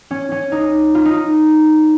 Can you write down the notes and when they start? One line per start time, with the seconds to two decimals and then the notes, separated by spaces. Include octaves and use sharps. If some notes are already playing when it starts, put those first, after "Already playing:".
0.11 C#4
0.32 C#4
0.52 D#4
0.95 F4
1.05 D#4